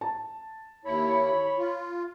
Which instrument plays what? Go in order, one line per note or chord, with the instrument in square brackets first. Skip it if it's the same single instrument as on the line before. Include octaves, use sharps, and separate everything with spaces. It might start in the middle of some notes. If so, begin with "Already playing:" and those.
[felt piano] A5
[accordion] D#2 E4 [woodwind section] C#5 B5
[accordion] F4